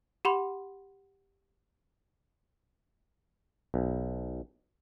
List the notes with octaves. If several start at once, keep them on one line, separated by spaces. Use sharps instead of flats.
G4 F#5 B5 C6
B1